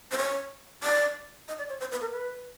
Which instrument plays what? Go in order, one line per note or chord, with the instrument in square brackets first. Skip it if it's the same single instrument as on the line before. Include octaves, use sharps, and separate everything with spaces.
[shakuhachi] C5
C#5
D5
D#5
D5
C#5
C5
B4
A#4
B4